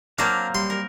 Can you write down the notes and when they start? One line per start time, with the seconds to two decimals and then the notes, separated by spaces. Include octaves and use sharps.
0.19 F#3 A#3 C4 D4 F5 A#5
0.55 G3 C6
0.70 A#4